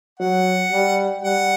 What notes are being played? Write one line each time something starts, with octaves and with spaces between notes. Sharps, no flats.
F#3 F#5
G3
G3 F#5